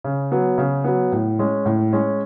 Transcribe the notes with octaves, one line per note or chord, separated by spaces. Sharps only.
C#3
F#3 B3
C#3
F#3 B3
A2
G#3 C#4
A2
G#3 C#4